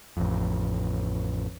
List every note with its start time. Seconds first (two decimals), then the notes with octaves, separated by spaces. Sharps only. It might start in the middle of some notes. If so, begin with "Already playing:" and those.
0.17 A1 F2